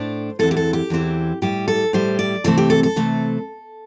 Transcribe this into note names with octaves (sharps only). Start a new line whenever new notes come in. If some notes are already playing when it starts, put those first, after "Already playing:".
Already playing: A2 A3 D4 C5
E2 E3 C4 E4 A4
G4
A4
G4
E2 E3 C4 E4
A2 G3 E4 G4
A4
A2 G3 E4 C5
D5
C3 E3 A3 C4 A4
G4
A4
A4
C3 E3 A3 C4